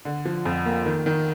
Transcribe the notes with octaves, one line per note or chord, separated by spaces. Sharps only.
D3
F3
F2
A#3
D#3
D#3